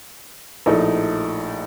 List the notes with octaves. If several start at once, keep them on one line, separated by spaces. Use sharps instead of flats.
A#1 A2 A3 D#4 A4